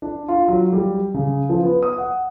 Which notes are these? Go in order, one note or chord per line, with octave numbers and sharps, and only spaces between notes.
D4
F4
F#3
G3
C#3
F3
B3
D#6
F#5